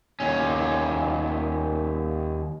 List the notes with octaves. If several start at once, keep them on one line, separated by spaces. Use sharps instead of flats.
D#2 C#4